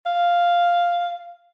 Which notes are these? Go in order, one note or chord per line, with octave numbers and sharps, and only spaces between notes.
F5